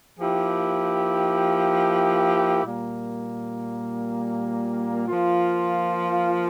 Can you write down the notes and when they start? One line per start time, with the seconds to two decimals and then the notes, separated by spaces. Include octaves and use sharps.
0.20 F3 A#3 E4 G4
2.63 A#2 G3 A#3
5.08 F3 A#3 F4